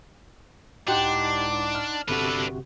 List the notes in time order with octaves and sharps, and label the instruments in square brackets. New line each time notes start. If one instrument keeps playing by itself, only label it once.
[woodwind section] C#2 A2 D6 [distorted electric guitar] D4 [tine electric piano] D#4 F#5 C6 [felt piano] G4
[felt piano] F6
[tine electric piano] G1 C3 F#4 [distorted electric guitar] D4 B4 [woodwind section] A4